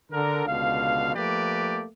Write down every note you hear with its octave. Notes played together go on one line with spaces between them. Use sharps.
D3 A#4
C#2 B2 D3 F5
F3 A3 A#3 G4 B4 D5